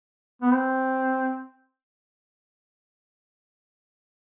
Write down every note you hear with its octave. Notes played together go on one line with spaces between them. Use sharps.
B3
C4